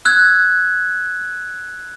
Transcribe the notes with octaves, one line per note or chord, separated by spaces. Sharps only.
E6 F#6 G#6